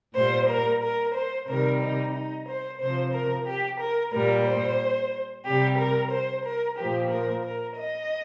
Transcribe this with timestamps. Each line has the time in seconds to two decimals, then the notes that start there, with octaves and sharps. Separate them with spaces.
0.16 A#2 G3 C5
0.49 A#4
0.83 A#4
1.15 C5
1.48 C3 D#3 G3 A#4
1.82 D#4
2.15 D#4
2.48 C5
2.80 C3 C5
2.85 F3
3.14 A#4
3.47 G4
3.80 A#4
4.13 A#2 G3 A#4
4.46 C5
5.46 C3 G3 G4
5.79 A#4
6.11 C5
6.45 A#4
6.78 A#2 F3 G4
7.11 A#4
7.44 A#4
7.78 D#5